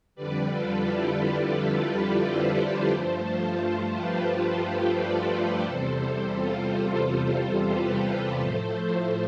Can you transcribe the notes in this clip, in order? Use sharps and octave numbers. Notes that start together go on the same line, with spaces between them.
F2 D3 G3 B4 D5
F4 A4
E4 G4
F4 A4
G4 B4
A4 C5
B4 D5
G2 F3 A3 A4 C5
F4 A4
F4 A4
G4 B4
B4 D5
B4 D5
E2 C3 G3 A4 C5
F4
F4 A4
G4 B4
A2 F3 A3 A4 C5